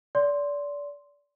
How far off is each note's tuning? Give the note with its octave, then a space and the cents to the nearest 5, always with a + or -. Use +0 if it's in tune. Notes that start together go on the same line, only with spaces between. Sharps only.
D5 -25 C6 +0